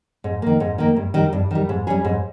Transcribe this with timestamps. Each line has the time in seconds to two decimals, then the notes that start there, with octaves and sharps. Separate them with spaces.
0.24 G#2
0.42 D#3 A#3
0.60 G#2
0.78 D#3 A#3
0.96 G2
1.14 D#3 G3
1.33 G2
1.51 D#3 G3
1.69 G#2
1.87 G3 C#4 G#4
2.05 G#2